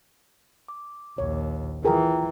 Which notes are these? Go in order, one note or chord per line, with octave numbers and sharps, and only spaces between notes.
D6
A#1 D#2 C#5
E3 F4 G#4 A#4 G5 A#5